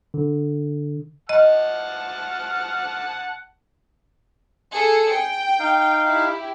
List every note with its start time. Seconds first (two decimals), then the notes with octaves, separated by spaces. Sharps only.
0.14 D3
1.29 D#5 F#5 A5 F6
4.72 G#4 A4 C#7
5.12 G5
5.59 D#4 F5
6.04 E4 G4